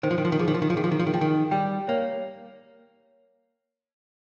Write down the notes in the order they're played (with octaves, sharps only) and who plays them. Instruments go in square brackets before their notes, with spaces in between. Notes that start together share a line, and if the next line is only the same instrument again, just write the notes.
[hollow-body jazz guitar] D#3 [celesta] C5
[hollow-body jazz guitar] F3
D#3
F3
D#3
[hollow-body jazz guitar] F3 [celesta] G#4
[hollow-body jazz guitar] D#3
F3
D#3
F3
[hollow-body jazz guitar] D#3 [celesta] G#4
[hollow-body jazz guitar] F3
D#3
F3
D#3
[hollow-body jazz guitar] F3 [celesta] G5
[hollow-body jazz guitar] D#3
[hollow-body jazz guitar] G3 [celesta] G5
[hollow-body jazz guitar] A#3 [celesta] C#5